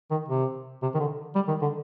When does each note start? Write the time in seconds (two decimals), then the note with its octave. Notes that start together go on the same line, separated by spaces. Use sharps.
0.11 D#3
0.28 C3
0.82 C3
0.94 D#3
1.00 D3
1.35 G3
1.48 D#3
1.62 D3